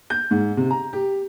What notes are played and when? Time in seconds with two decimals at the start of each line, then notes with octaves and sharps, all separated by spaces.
0.10 G6
0.31 G#2
0.57 C3
0.71 A#5
0.93 G4